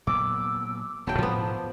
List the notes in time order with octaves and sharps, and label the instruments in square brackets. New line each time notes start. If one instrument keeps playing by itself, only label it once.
[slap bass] A#2 F#3 B3 [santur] D6 [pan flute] E6
[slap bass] D#1 B3 [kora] F#3 G5 [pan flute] A5
[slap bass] G#2 B2 [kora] F3 B3